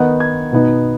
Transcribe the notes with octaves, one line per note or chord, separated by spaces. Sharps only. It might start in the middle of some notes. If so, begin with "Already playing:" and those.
Already playing: D#3 B3 D#4 F#5
G#6
B2 B3 D#4